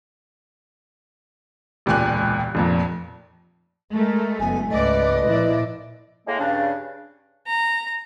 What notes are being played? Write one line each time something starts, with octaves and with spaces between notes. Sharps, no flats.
E1 C#2 A#2 G4 G#5 F#6
F1 F2 A#2
G#3 A3 A#4
F#1 B3 G#5
C#2 G#2 A3 B4 D5 D#5
A#2 F3 E4 D5
A2 G#3 A#3
G2 C#3 D4
A#5